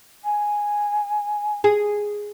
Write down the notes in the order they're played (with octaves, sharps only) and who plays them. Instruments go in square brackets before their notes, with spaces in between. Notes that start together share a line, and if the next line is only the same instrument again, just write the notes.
[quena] G#5
[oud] G#4